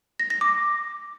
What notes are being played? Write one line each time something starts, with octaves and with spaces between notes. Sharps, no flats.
A#6
A#6
D6